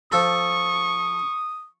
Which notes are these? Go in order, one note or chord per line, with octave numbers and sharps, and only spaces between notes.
F3 A4 C#6 D#6